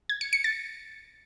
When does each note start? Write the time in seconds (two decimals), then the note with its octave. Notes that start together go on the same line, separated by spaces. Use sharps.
0.09 G#6
0.21 C#7
0.33 C#7
0.44 A6